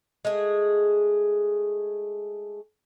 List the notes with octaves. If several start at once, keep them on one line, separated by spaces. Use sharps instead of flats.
G#3 A3 G#4